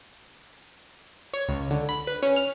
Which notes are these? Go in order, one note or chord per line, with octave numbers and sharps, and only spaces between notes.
C#5
C#2
D3
B5
B4
C#4
F6